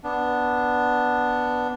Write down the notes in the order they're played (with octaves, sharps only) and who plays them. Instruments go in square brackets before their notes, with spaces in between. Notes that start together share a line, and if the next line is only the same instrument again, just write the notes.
[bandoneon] B3 D4